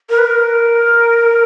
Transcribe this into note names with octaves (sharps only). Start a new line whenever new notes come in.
A#4
B4
A#4